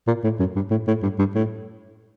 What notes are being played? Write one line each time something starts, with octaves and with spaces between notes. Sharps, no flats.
A#2
A2
F#2
G2
A2
A2
G2
G2
A2